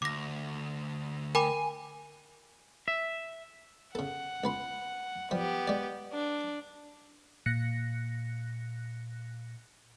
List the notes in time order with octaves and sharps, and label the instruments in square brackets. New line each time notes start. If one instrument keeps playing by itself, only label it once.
[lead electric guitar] D2 [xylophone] D6 A#6
[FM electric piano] A#4 [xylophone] G5 B5 D6 [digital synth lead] G#5
[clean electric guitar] E5
[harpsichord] C#3 A4 [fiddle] F#5
[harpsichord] C#2 B4 C6
[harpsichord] F3 G3 [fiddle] B3 G4
[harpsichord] G#3 D5
[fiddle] D4
[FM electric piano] A#2 F#6 A#6 C#7